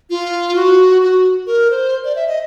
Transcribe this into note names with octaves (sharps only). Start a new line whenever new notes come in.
F4
F#4
F#4
A#4
C5
D5
E5
D#5